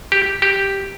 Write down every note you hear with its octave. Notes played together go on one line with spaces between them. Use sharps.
G4
G4